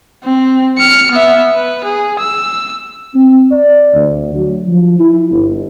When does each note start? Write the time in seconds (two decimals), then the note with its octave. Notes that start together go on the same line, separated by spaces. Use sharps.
0.24 C4
0.78 F6 C#7
1.11 B3 E5
1.55 B4
1.84 G#4
2.19 E6
3.14 C4
3.51 D5
3.93 D2
4.34 F#3
4.66 F3
4.99 E4
5.31 G1